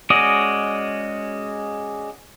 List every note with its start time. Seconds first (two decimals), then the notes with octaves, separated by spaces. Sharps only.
0.10 G#3 C#4 F#4 D5 D#5